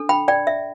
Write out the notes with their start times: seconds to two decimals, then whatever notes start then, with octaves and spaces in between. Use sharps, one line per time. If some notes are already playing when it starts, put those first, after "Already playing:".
Already playing: D4 A4
0.09 G5 B5
0.28 D5 G5
0.47 E5